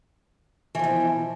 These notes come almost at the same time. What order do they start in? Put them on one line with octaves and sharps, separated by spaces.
E3 F3 B2